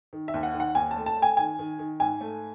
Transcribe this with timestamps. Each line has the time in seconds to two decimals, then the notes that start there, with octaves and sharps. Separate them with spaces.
0.13 D#3
0.28 E5
0.34 D#2
0.43 F#5
0.54 D#3
0.60 F#5
0.75 D#2 G#5
0.91 A5
0.96 A3
1.06 A5
1.17 A3
1.22 G#5
1.37 D#3 G#5
1.59 D#3
1.79 D#3
2.00 G#2 G#5
2.21 A3